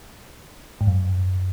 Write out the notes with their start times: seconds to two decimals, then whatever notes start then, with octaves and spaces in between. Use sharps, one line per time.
0.81 G#2
0.87 F#2